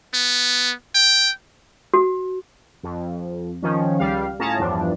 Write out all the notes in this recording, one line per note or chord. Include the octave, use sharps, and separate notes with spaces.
B3
G5
F#4
F2
D#3 F3 C#4
C#2 G3 F5
A2 C#4 F4 G#4 A5 A#5
E2 G2 F3 D4